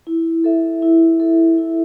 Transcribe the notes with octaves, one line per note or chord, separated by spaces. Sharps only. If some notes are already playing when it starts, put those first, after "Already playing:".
E4
A4 E5
E4
A4 E5
E4